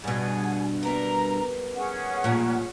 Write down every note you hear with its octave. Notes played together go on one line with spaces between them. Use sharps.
G2 B2 G#4 F#5 G#5
G3 B3 A#4 A#5
C#4 G#4 F#5
A#2 F3 G3 A3